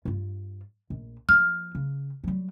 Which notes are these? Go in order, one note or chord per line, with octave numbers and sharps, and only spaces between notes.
G2 F4
A#1
F3 A#3 F6
C#3
F#3 G3